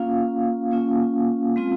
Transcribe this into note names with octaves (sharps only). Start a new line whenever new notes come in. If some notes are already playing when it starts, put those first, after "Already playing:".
Already playing: A#3 C#4 F4 F5
A#3 C#4 F4
G#3 C4 F4